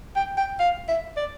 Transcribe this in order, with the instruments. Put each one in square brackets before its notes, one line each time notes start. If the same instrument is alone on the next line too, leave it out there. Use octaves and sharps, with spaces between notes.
[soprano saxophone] G5
G5
F5
E5
D5